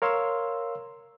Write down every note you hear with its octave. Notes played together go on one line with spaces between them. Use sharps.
A#4 C#5 F5 C6 E6